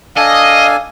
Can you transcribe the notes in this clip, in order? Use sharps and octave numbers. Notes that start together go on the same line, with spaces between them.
D4 A4 D#5 F5 G#5